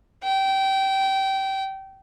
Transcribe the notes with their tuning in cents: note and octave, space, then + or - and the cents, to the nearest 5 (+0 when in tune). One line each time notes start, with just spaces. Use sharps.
G5 -20